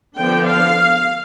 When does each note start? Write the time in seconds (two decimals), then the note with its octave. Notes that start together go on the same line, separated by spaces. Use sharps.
0.18 D3 F3 B3 D4 G5
0.47 F5